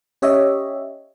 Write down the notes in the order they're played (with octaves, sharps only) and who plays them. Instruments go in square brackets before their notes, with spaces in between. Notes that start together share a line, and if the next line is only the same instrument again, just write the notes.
[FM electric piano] C#4 G4 C#5 D#5 E5